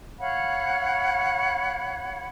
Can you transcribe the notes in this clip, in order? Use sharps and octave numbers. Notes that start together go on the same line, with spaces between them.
C#5 F5 F#5 B5